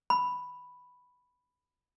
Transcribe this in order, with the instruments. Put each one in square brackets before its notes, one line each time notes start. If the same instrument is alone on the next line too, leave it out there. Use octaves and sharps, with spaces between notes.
[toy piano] B5